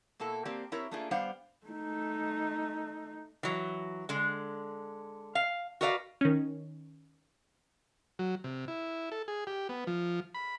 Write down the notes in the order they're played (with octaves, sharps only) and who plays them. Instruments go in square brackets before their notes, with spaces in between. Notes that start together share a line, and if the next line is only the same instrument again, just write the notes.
[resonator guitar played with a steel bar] B2 A#3 E4 A4
A#3 C4 G4 D5
C4 E4 G4 A#4 C#5
A3 A#3 D4 F4 G#4
G3 B3 D4 C5 F5 F#5
[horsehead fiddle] A3 D#4
[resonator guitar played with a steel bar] E3 F#3
D3 G#3
F5
F#4 A#4 B4 D5 E5 F5
[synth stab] D#3 C#4
[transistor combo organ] F#3
C3
E4
A4
G#4
G4
B3
F3
B5